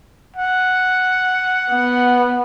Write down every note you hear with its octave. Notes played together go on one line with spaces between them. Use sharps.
F#5
B3